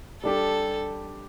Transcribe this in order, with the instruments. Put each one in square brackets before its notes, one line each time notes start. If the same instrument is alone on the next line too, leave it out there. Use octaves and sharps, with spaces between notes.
[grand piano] G3 D4 G4 [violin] A4